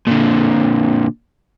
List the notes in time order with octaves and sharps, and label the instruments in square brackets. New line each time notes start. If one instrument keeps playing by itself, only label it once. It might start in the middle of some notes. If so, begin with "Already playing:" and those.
[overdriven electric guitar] A#2 D3